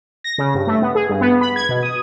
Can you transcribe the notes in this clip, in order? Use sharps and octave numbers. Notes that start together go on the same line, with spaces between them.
A#6
C#3
G2
A3
B3
G#4
G2
B3
B5
G#6
B2
D#6